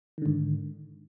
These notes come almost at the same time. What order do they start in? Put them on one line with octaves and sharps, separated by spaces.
D#3 D3 G#2